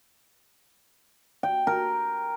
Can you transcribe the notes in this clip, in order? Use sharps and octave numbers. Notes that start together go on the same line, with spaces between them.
G5
A#4